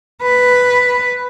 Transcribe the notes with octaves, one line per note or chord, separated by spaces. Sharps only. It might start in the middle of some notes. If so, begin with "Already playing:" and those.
B4